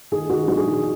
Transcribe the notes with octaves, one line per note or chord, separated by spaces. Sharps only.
D#3 G#4
D#3 F#4
A#1 F#4
G#4
D#3